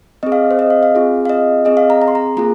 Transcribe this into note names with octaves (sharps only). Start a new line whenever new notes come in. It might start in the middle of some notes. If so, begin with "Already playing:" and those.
C4 G#4 D#5
F5
C5
D#5
F5
F5
C4 F4 G#4
F5
D#5
C4 G#4 D#5
F5
A#5
A#5
C6
A#5
A#3 F4 G#4 A#5